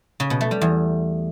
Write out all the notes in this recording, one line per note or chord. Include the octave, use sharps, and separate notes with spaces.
C#3
B2
A3
G3
E2